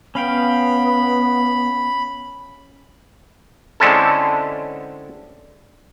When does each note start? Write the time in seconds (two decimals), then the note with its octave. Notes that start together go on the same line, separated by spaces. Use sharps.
0.15 B3 C#4 F5 G5 B5
3.80 D3 G#3 C4 C#4 E4 A4